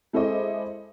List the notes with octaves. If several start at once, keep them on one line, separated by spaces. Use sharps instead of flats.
G#3 E4 A4 C5 D#5 D6